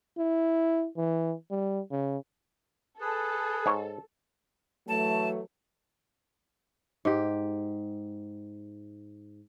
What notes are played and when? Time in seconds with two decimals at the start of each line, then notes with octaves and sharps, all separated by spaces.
0.18 E4
0.97 E3
1.51 G3
1.91 C#3
3.01 G#4 A4 B4
3.66 G#2 C#5
4.88 E3 F#3 A3 A5
7.05 G#2 G4